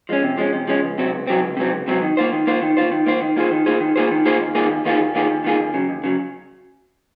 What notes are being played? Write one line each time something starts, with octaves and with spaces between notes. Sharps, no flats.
F3 G#3 C#4
C3
F3 G#3 C#4
C3
F3 G#3 C#4
C#2
C3 F#3 C4
C#2
C3 F#3 C4
C#2
C3 F#3 C4
C#2
C3 F#3 C4
D#3
A#3 F4 C5
D#3
A#3 F4 C5
D#3
A#3 F4 C5
D#3
A#3 F4 C5
D#3
A#3 F4 G#4 C5
D#3
A#3 F4 G#4 C5
D#3
A#3 F4 G#4 C5
D#3
A#3 F4 G#4 C5
D#2
D#3 A#3 F4 G#4
D#2
D#3 A#3 F4 G#4
D#2
D#3 A#3 F4 G#4
D#2
D#3 A#3 F4 G#4
D#2
C#3 F#3
D#2
C#3 F#3